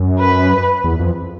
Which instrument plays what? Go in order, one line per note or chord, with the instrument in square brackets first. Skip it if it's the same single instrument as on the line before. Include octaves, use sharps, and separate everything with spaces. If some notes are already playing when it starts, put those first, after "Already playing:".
Already playing: [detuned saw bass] F#2
[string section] B4
[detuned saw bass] E2
F2